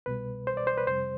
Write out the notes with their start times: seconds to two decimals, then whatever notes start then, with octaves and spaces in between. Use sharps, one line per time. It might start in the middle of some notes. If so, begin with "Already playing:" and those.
0.06 C2 B2 G3 B4
0.47 C5
0.57 D5
0.67 C5
0.78 B4
0.87 F2 C3 G3 C5